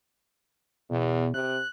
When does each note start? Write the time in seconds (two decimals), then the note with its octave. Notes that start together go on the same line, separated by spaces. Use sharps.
0.90 E2 B2
1.34 C3 F#6